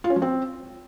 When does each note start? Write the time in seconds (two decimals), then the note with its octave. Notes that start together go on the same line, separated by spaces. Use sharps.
0.04 F4
0.10 C#4
0.16 F3
0.22 C4